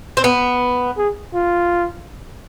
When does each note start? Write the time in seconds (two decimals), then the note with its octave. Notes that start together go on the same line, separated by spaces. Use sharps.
0.17 C4
0.24 B3
0.98 G#4
1.34 F4